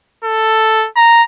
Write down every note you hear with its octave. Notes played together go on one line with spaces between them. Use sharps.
A4
A#5